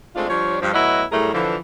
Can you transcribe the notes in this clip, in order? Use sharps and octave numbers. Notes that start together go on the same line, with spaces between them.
G#3 A3 C4 D4 F4
F3 G3 D4 C#5
G2 F3
A2 F#3 B3 E4 D#5 F#5
A2 F#3 G3 A3 G#4 A#4
D3 E3 F3